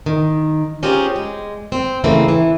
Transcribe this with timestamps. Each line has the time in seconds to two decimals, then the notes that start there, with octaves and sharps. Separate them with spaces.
0.06 D#3
0.83 C4 C#4 F4 G4 G#4 A#4
1.16 G#3
1.72 C4
2.04 C#3 E3 A3 A#3 C4
2.28 E3